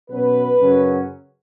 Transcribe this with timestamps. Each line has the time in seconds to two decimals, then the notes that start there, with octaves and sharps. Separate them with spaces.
0.09 B2 F#3 C#4 B4
0.61 F#2 C#3 F#3 C#4